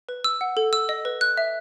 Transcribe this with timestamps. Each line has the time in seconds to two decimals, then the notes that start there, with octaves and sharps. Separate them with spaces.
0.09 B4
0.24 E6
0.41 F#5
0.57 A4
0.73 E6
0.89 D#5
1.05 B4
1.21 F#6
1.37 E5